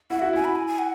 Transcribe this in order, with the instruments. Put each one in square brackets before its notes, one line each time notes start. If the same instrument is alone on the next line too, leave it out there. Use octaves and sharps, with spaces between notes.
[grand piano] E4 [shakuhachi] F#5
[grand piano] F#4 [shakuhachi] E5
[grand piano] E4 [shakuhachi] G#5
[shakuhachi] B5
G#5
G#5
F#5